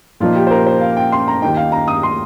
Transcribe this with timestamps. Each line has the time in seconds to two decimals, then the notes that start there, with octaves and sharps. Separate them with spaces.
0.20 A#2 F3 A#3 D#4 F4
0.36 G4
0.47 C5
0.51 A#4
0.67 C5
0.81 F5
0.96 G5
1.12 C6
1.28 A#5
1.42 D#2 D#3 A#3 D#4 G5
1.57 F5
1.72 A#5
1.88 D#6
2.03 C6